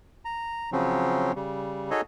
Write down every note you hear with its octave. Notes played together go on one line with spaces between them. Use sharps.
A#5
C#3 F3 F#3 C4 C#4
C#3 G3
D#4 F#4 G#4 A4 C#5 D#5